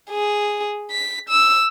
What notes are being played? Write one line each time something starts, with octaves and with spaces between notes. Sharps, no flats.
G#4
B6
E6